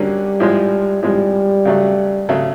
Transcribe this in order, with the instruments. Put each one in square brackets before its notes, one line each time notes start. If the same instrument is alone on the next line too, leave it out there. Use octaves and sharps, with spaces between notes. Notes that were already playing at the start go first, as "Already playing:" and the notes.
Already playing: [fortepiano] D3 F#3 A#3 C#4 [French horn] G3
[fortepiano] A2 F3 G#3
[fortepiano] A2 F3 G#3 [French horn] G3
[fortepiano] C#3 F#3 A3
C#3 F#3 A3